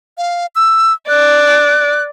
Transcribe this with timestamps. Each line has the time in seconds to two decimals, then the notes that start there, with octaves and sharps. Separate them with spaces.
0.18 F5
0.55 E6
1.09 D5 F#6